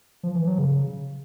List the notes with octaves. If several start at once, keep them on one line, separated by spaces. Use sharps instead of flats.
F3
E3
F#3
C#3